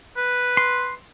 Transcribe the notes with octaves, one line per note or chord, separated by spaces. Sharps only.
B4
C6